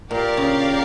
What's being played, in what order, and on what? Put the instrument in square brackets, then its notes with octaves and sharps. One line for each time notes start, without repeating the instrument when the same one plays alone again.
[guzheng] A#2 [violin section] G4 A#4 D5 F5
[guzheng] C#3